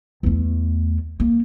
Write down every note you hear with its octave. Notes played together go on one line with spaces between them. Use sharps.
E2 A3
A#3